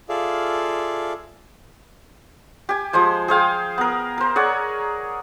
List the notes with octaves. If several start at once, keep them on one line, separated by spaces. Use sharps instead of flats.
F4 G#4 A4 D5 E5 F5
G4 G#5
F3 G#3 C5 G#5
G#4 C5 F5 G5
B3 A#4
A#4 C5
G#4 C#5 D5 F#5